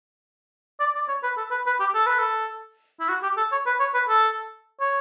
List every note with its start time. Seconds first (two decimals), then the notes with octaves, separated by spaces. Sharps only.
0.80 D5
0.95 D5
1.08 C#5
1.23 B4
1.37 A4
1.51 B4
1.66 B4
1.80 G4
1.95 A4
2.07 B4
2.19 A4
3.01 E4
3.09 F#4
3.23 G4
3.37 A4
3.52 C#5
3.66 B4
3.80 C#5
3.94 B4
4.09 A4
4.81 C#5